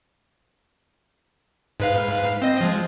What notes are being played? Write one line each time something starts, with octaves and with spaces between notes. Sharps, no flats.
G#2 B4 F5
C4 D#5
F3 G#3